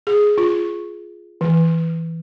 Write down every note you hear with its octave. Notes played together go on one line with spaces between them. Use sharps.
G#4
F4
E3